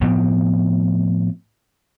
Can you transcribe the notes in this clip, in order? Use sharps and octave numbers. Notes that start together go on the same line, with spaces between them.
A2 F3 B3 C4